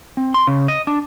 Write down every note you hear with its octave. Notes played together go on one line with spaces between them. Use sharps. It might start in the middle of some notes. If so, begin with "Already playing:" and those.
C4
C6
C#3
D#5
D4